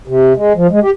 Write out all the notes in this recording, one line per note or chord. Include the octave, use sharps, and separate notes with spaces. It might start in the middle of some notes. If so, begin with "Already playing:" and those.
C3
G#3
F3
G#3
G4